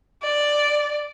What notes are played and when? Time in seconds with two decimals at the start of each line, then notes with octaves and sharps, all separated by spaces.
0.23 D5